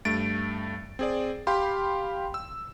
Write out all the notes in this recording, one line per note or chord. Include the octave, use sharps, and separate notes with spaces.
G2 A3 A6 D7
C4 G#4 D5
G4 F5 G5 B5 C6
E6